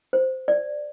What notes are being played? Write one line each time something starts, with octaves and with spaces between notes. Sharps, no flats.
C5
D5